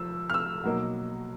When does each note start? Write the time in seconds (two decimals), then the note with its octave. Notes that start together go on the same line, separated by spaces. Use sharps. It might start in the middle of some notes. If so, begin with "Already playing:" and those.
Already playing: F3 E6
0.30 F6
0.34 E6
0.64 B2 F#3 A#3 D#4